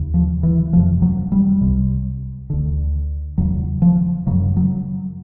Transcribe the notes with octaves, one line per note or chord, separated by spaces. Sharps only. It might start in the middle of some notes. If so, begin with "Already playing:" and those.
Already playing: D#2 C#3
F3
E3
F2 C3 F3
F#3
G3
C2 C3
D2 D3
E2 C#3 F#3
F3
F#2 C#3 F#3
F#3